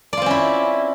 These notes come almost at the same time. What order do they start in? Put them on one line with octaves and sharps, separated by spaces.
D5 F4 C4 C#4 E4